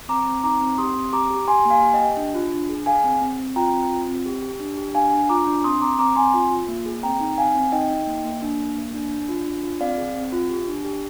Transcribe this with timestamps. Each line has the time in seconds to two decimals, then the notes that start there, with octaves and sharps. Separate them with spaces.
0.09 C4 A#5 D6
0.26 C4
0.43 D#4 A#5 D6
0.61 C4
0.78 G4 C6 D#6
0.96 C4
1.13 G4 A#5 D6
1.30 G4
1.48 G4 G#5 C6
1.65 A#3
1.70 F5 G#5
1.83 G4
1.94 D#5 G5
2.00 G4
2.17 D4
2.34 F4
2.52 D4
2.69 G#4
2.86 G#4 F5 G#5
3.04 C4
3.21 C4
3.39 C4
3.56 F4 G5 A#5
3.73 C4
3.91 F4
4.08 C4
4.26 G4
4.42 G4
4.60 D4
4.78 G4
4.95 D4 F5 G#5
5.12 D4
5.29 F4 A#5 D6
5.47 D4
5.64 C4 C6 D#6
5.81 C4 A#5 D6
5.98 C4 A#5 D6
6.16 C4 G#5 C6
6.34 F4
6.51 F4
6.69 A#3
6.86 G#4
7.03 C4 G5 A#5
7.20 D#4
7.38 C4 F5 G#5
7.55 C4
7.72 D#4 D#5 G5
7.90 D#4
8.07 A#3
8.24 A#3
8.42 D4
8.59 A#3
8.76 A#3
8.94 D4
9.11 D4
9.28 F4
9.46 D4
9.64 F4
9.81 C4 D5 F5
9.98 G#4
10.15 C4
10.32 F4
10.50 G4
10.68 D4
10.85 G4